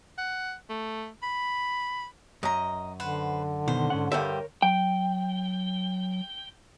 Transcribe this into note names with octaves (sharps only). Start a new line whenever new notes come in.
F#5
A3
B5
F#2 D#5 A#5
D3 B4 C5 F#5
B2 D#3 C5
G#2 C#4 F#5
G2 G3 A#4 C5 C#5 E5
F#3 G5